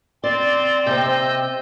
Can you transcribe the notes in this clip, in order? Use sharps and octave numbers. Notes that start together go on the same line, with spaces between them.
C4 D5 C6 A6
C3 C4 D#5 E6 G6